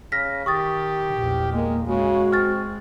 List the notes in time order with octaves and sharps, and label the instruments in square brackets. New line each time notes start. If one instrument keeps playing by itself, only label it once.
[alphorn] C#3 [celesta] F6 A#6 B6
[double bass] D#3 [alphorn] G4 [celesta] C#6 D#6 A6
[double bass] A#1 E2
[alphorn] G#3 [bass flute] A#3
[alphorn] C#3 [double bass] G#3 [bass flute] F#4
[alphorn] C4 [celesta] C#6 F6 A6